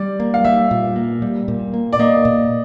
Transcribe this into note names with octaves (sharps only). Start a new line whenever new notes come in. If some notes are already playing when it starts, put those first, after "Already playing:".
Already playing: G3 D5
A#3
F5
G3 E5
A#2
A#3
G3
A#2
A#3
D5
A#3 D#5
A#2